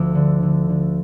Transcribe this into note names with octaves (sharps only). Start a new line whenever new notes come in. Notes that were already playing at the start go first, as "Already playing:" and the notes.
Already playing: D2 F3 D6 E6
D3
D3
D3